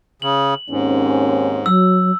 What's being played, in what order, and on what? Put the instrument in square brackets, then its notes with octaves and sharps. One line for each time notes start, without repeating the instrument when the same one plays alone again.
[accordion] C#3 [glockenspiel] F#7
[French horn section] D#2 C4 C#4 [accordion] G#2
[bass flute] F#3 [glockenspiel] E6